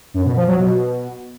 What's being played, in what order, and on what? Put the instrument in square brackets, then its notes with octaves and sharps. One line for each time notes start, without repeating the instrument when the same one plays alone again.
[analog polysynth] F#2
B2
F3
F#3
B2